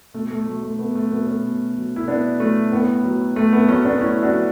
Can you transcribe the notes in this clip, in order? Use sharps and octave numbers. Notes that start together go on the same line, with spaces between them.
B2 A3
A3
F#3 A3
A3
B2 B3
A3
F#3 B3
A3 C#4
B2
F#3
E4
B2 B3 D4
F#3 A3 C#4
A2 B3
F#3
A2 A3
B3
F#3 A3 C#4
B3 D4
A2 C#4 E4
D4 F#4
F#3